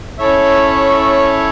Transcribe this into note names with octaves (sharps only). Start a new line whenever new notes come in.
C#4 E4 A4 C#5 E5